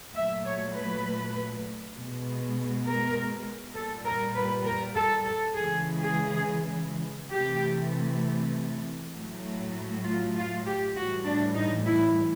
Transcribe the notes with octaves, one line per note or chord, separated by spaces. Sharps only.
A#2 F#3 A3 E5
C#5
B4
B2 G#3
A#4
A#2 G3 A4
A#4
B4
A#4
A4
A4
C#3 E3 G#3 G#4
G#4
C3 E3 A3 G4
A2 F#3 A3
F4
F4
G4
A2 E3 G3 F#4
D4
D#4
E4